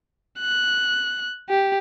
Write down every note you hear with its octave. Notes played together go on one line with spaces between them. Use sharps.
F#6
G4